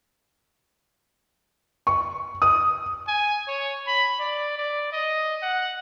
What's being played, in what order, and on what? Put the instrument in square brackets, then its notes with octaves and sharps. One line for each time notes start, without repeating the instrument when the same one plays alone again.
[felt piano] C#6
D#6
[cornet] G#5
C#5
B5
D5
D5
D#5
F#5